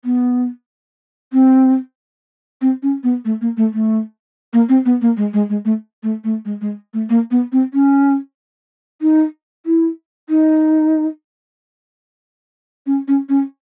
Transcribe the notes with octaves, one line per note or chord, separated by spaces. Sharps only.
B3
C4
C4
C#4
B3
A3
A#3
A3
A3
A#3
C4
B3
A#3
G#3
G#3
G#3
A3
A3
A3
G#3
G#3
A3
A#3
B3
C4
C#4
D#4
E4
D#4
C#4
C#4
C#4